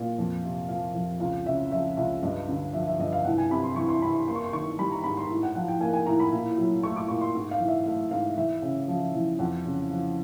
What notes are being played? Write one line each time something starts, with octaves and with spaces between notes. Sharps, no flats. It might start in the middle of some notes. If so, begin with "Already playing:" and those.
Already playing: A#2
F2
C3
F3 F5
F2
C#2 F5
C#3 E5
F3 E5
C#2 E5
G2 D#5
D3
F3 E5
E5
G2 D#5
F5
C2 F#5
G#5
C3 B5
C6
E3 C#6
C6
C2 B5
C6
A#3 C6
C#6
C6
D#3 C#6
G3 B5
A#5
G#2 B5
C6
A2
F#5
F3 F#5
G5
A#3 G#5
G#5
A2 A#5
B5
A#2
F#3
A3 C#6
D6
A#2 C#6
C6
G#2
F5
E3
E5
A3 F5
G#2 F5
E2 E5
C#3
F3
E2
F2 F#5
C#3
F3